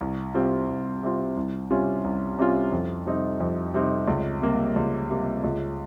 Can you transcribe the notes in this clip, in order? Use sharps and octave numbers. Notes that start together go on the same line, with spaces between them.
C2
C3 G3 C4 F4
C2
C3 G3 C4 F4
C2
C3 G3 C#4 F4
C2
C3 G3 C#4 F4
F2
C3 G3 C4 D#4
F2
C3 G3 C4 D#4
C#2
C3 G3 A#3
C#2
C3 G3 A#3
C#2